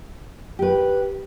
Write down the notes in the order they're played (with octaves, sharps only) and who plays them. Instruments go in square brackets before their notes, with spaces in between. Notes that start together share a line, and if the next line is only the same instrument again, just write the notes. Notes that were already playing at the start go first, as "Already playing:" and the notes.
[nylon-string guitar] G4 B4